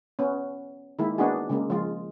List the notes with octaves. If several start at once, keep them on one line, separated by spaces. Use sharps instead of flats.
B3 C#4
D#3 G#3 A#3 E4
A#3 B3 D4 D#4 F#4 G#4
C#3 G#3 A#3
F3 G#3 F4